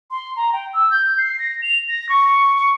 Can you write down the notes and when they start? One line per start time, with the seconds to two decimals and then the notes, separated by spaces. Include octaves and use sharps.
0.11 C6
0.36 A#5
0.53 G5
0.73 E6
0.91 G6
1.18 C7
1.39 A#6
1.62 F7
1.88 A#6
2.09 C#6
2.56 C#6